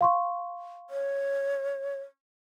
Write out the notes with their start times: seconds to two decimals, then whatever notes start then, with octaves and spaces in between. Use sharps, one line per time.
0.01 F5 C6 C#6
0.90 C#5